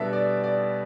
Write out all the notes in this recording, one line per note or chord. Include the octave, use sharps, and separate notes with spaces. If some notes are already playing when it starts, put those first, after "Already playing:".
Already playing: B2 G3 B3 D4 A4 D5 E5
D5
D5